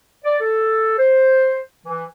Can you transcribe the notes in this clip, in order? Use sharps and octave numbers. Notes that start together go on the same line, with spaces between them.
D5
A4
C5
E3